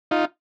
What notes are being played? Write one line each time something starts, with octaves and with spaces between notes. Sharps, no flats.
D#4 F4